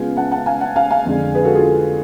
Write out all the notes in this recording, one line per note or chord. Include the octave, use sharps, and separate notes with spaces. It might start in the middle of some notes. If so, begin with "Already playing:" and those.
Already playing: C#3 G#3 B3 F4 F5 G#5
F#5 A5
F#5 A5
F5 G#5
F#5 A5
F5 G#5
F5 G#5
F2 D3 G#3
G#4 B4
F#4 A4
F4 G#4